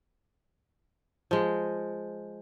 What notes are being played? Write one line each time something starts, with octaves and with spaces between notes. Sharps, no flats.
F3 G#3